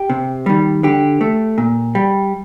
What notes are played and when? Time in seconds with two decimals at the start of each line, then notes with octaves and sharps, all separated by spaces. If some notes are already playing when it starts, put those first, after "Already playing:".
Already playing: G4
0.10 C3
0.46 D#3 G3
0.83 D3 G4
1.21 A3
1.58 A#2
1.95 G3